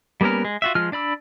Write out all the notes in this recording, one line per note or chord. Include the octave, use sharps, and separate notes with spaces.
G3 A#3 B3 C#4 A#4
G#3
F4 F#4 E5
F3 G#3 F4 F6
D4 D5 B5 E6